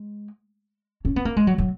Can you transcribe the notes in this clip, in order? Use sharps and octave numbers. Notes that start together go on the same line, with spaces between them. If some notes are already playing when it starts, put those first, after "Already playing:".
Already playing: G#3
C#4
B3
A#3
G#3
F#3
F#3